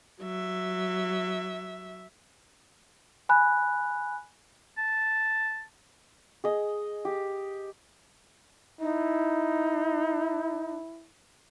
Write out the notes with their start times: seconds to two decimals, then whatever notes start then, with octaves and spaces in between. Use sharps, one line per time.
0.21 F#3 E5
3.29 G#5 B5 F#6
4.78 A5
6.44 G#4 D#5
7.05 G4
8.81 D#4 E4